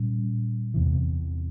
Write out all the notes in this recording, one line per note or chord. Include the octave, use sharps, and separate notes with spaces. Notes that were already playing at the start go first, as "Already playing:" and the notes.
Already playing: A#2 G3 C#4
E2 C3 E3